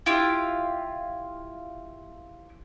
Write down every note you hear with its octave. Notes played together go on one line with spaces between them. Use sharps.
E4 F4 G4